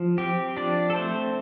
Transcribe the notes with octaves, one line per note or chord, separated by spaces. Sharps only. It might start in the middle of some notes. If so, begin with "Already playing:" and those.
Already playing: F3
C4 G4
F3 D4 D5
A4
A3 C4 C5